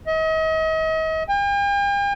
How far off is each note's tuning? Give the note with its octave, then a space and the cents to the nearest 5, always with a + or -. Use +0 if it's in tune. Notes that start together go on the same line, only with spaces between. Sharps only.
D#5 +40
G5 +45